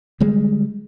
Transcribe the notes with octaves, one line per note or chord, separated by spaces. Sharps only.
D3 G3 G#3